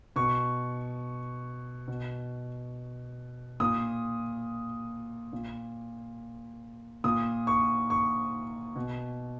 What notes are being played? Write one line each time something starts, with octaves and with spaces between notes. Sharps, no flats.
B2 C#6
B2
A#2 D#6
A#2
A#2 D#6
C#6
C#6
B2